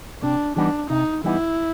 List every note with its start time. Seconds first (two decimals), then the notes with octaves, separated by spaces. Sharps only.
0.23 C3 D4
0.56 E3 G3 B3 D4 D#4
0.90 C3 D#4
1.24 E3 G3 B3 D#4 E4